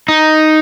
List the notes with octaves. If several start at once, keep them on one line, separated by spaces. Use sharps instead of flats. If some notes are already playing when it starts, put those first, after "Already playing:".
D#4